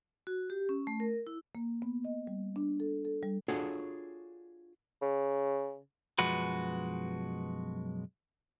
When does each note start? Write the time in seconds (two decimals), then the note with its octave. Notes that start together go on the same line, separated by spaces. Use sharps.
0.27 F#4
0.50 G4
0.69 C#4
0.87 A3
1.00 A#4
1.27 E4
1.55 A#3
1.82 B3
2.04 D#5
2.27 G3
2.56 D4
2.80 A4
3.05 A4
3.23 G3
3.48 D4 F4 F#4 G#4 A4 C#5
5.02 C#3
6.19 B1 F#2 F3 G#3 F#4 B4